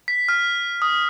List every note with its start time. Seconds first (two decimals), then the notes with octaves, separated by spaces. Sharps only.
0.08 B6
0.29 F6
0.82 D#6